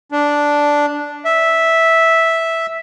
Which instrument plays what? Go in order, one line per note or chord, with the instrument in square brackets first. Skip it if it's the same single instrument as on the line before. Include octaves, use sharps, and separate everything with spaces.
[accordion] D4
E5